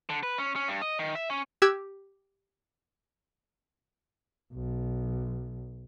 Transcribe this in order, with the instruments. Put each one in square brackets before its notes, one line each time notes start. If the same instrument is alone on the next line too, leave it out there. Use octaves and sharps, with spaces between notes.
[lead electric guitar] D3
B4
C#4
C#4
G2
D#5
D#3
E5
C#4
[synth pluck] G4 E6 F#6 G#6
[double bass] B1